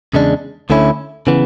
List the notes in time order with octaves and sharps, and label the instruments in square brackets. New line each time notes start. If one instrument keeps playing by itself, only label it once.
[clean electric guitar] E2 C#3 G#3 D4
D2 D3 A3 C#4 E4
C#3 E3 B3